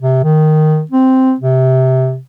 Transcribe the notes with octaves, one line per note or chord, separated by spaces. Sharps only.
C3
D#3
C4
C3